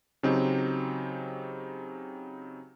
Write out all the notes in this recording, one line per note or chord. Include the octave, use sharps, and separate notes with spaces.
C#3 F#3 C4 D#4 G4